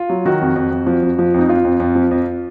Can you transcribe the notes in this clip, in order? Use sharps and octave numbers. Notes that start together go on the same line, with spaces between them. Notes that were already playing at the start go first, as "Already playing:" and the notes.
Already playing: F4
F#3
D#3 F#4
F2
F2
F2
F3
F2
F3
F2 D#4
F3 F4
F2
F2
F3
F2